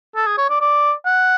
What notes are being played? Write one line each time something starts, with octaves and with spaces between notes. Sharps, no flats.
A4
G#4
C#5
D5
D5
F#5